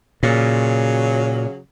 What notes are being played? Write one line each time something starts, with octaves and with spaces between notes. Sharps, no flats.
A#2 C#3 F#3